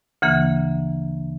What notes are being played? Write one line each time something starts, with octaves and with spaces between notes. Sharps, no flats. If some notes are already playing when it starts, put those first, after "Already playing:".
D2 C#3 E3 A#3